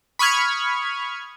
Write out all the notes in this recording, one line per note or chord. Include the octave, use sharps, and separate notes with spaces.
B5 C#6 D#6 F6 G#6